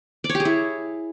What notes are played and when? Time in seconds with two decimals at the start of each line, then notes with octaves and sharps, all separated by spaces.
0.24 D5
0.29 C#5
0.35 G4
0.40 G#4
0.45 E4